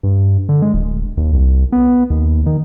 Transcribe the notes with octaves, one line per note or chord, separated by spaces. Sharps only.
G2
D3
G#3
D1
D#2
C2
B3
D#2
D#3